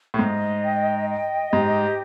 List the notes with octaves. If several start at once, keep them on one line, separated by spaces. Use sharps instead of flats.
A2
G#2 D#5
G5
D#5
G#2 G4